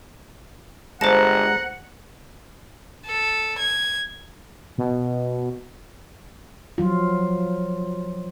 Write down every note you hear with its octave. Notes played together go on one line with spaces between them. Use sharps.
G1 G#3 C5 F#5 A5 A#5
A4
G#6
B2
F3 F#3 F4